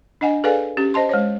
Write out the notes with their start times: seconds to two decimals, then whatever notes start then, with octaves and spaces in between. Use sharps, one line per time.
0.21 D4 D#5 F#5 G#5
0.44 G#4 A4 B4 D5 F5 G#5
0.77 C#4 G4
0.94 C5 D#5 A5 C6
1.09 G#3 C5 C#5